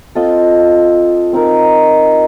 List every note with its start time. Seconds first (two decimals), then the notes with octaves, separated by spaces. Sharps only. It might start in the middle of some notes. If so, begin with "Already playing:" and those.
0.15 C4 F4 A4 D#5
1.33 C4 D#4 A#4